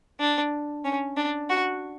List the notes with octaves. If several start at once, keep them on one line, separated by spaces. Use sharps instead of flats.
D4
C#4
D4
F#4